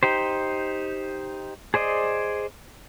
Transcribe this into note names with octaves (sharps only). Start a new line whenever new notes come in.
D#4 G4 C5
G#4 C5 D5 D#5